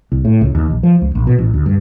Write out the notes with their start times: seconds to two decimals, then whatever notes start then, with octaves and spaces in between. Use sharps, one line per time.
0.12 C2
0.25 A2
0.41 C#2
0.55 D#2
0.70 A#1
0.83 F3
1.01 C#2
1.15 A#1
1.27 B2
1.39 A1
1.54 D2
1.66 G2